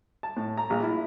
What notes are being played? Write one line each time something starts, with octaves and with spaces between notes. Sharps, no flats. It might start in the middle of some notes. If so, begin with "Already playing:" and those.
A5
A2
A#5
A#1
E4